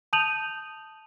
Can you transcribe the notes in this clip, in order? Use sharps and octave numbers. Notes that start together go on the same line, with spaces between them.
A5 D#6 G6 D#7 F7 F#7